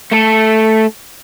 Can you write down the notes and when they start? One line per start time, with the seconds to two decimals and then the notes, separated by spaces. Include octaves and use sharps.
0.12 A3 A4